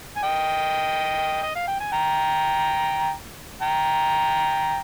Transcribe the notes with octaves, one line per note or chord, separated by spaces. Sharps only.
G#5
D#5 G5
D#5
F5
G5
G#5
G5 A#5
G5 A#5